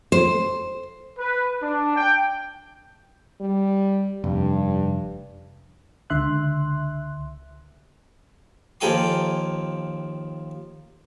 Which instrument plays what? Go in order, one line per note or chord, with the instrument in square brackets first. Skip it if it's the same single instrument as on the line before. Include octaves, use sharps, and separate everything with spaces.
[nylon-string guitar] C5
[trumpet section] B4
D4
G5
[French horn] G3
[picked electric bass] F1 [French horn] G2
[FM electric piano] C#2 D3 E5 C6 F#6
[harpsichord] D#2 F3 A4 G5 G#5 C6